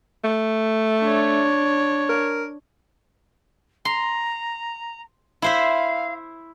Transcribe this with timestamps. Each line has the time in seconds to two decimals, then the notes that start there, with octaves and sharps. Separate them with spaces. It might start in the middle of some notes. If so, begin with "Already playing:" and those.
0.24 A3
1.02 D4 C#5
2.10 A#4
3.85 A#5 C6
5.42 E4 C5 E5 F5